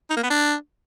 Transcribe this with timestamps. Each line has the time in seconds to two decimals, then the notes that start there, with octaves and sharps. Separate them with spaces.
0.10 D#4
0.17 A#3
0.23 B3
0.30 D4